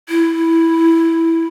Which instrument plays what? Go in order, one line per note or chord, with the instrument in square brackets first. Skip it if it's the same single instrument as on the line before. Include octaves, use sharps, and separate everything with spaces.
[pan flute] E4